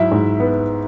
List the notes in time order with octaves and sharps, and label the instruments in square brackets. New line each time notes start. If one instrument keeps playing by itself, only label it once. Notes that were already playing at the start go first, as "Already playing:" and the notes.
Already playing: [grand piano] G#2 F#3 E4 E5
G#2
B3